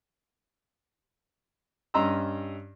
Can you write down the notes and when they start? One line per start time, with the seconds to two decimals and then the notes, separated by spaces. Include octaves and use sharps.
1.94 G2 C#4 D#5 A#5 C6 E6